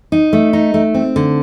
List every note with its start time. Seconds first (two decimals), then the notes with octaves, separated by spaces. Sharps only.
0.12 D#4
0.33 A3
0.53 D#4
0.74 A3
0.94 C4
1.16 D3